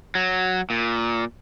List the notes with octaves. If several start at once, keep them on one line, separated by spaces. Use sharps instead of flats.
F#3
A#2